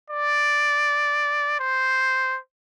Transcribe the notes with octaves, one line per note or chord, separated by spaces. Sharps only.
D5
C5